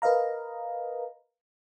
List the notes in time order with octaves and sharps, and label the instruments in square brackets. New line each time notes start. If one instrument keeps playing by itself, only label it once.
[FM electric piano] A#4 B4 D#5 F5 A#5